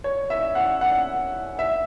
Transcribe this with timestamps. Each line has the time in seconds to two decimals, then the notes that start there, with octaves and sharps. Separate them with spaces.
0.04 C#5
0.30 E5
0.55 F#5
0.81 F#5
1.59 E5